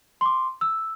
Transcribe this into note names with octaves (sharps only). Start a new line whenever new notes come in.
C6 D6
E6